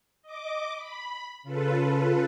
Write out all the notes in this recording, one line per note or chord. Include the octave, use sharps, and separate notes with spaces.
D#5 D6
B5
C#3 F4 A4 B4